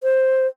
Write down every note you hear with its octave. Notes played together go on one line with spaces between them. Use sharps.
C5